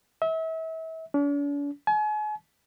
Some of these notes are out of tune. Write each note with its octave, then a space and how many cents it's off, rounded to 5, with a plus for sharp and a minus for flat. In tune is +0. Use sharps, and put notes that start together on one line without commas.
E5 -35
D4 -45
G#5 +40